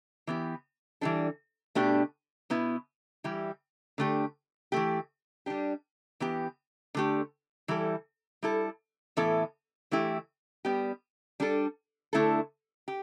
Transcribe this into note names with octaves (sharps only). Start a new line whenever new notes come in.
E3 B3 G4
E3 G3 D4 A4
B2 A3 D4 G4
B2 B3 E4
E3 G3 E4 G4
D3 A3 G4
E3 A3 G4
G3 D4 G4
E3 B3 G4
D3 A3 G4
E3 G3 E4 A4
G3 E4 A4
A2 E3 B3 E4 A4
E3 A3 E4 G4
G3 B3 G4
G3 D4 A4
D3 A3 E4 A4
G4